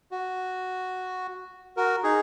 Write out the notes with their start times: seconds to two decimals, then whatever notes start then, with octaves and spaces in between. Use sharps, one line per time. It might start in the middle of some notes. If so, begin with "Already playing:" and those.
0.11 F#4
1.77 F#4 A#4
2.04 D#4 G#4